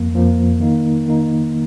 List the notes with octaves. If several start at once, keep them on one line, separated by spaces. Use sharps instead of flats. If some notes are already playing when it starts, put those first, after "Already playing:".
Already playing: F2 F3 A#3
F2 F3 A#3
D#3 A#3 D#4
D#3 A#3 D#4